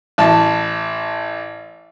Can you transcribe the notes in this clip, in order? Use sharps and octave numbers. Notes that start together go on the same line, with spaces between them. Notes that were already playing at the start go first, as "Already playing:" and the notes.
A1 A5